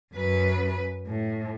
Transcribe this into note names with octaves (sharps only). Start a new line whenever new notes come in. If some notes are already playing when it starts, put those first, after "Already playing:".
F#2 B4
A2